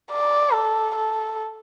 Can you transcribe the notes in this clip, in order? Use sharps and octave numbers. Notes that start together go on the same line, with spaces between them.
D5
A4
A4